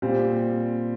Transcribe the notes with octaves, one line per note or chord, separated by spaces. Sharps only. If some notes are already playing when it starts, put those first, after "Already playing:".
A#2 G3 C4